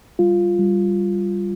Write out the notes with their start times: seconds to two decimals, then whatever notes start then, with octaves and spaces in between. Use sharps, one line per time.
0.19 G3 F4
0.59 G3